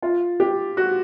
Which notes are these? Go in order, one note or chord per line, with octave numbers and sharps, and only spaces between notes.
F4
G4
F#4